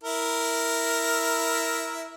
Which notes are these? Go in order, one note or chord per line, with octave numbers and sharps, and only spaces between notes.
E4 A#4